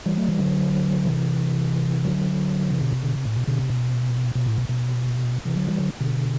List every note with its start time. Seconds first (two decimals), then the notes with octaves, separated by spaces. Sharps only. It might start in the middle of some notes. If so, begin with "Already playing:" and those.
0.06 E3 G3
0.17 F#3 A3
0.28 E3 G3
0.39 D3 F#3
1.05 C3 E3
2.04 D3 F#3
2.70 C3 E3
2.81 B2 D3
2.92 C3
3.03 B2 D3
3.14 C3
3.25 A2
3.36 B2
3.47 B2 D3
3.58 C3
3.70 B2
4.35 B2
4.46 A2
4.58 B2
4.69 B2
5.45 C3 E3
5.56 D3 F#3
5.67 E3 G3
5.78 D3 F#3
6.00 B2 D3